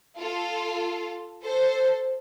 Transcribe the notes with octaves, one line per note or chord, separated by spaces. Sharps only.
F4 A4
A4 C5